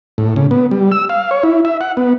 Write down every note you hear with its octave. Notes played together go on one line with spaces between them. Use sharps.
A2
C#3
B3
G3
E6
F5
C#5
E4
E5
F#5
B3